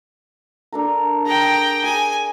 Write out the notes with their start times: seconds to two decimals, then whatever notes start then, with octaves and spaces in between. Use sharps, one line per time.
0.72 D4 A4 A#4
1.26 G#4 G5 A#5
1.84 G#4 G#5